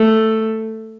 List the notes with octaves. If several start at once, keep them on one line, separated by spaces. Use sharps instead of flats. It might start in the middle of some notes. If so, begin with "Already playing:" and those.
Already playing: A3